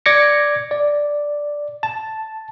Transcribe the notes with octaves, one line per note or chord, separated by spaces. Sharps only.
D5 D6 G#6 A#6 C#7
D5
A5